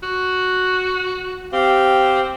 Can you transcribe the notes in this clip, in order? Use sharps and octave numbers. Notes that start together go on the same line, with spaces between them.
F#4
C4 G4 F5